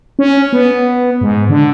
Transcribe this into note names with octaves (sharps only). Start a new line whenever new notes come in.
C#4
B3
G#2
D3